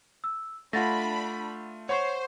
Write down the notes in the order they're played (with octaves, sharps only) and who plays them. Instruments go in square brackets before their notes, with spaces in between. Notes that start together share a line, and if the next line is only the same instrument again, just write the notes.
[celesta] E6
[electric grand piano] A3 F4 [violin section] D4 B5 [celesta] F#5 A6 A#6
[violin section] C5 [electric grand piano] C#5 [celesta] F#5 C#6